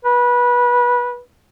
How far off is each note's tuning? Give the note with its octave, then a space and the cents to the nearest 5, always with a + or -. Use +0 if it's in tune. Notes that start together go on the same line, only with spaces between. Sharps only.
B4 -20